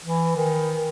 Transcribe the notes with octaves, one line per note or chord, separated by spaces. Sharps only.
E3
D#3